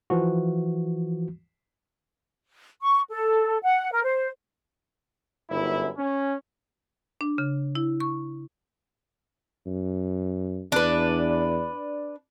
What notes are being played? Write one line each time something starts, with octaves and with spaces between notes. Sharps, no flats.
E3 F3 F#4
C#6
A4
F#5
A#4
C5
G1 F#2 E4
C#4
D4
C#3
E4
C#6
F#2
E2 D4 B4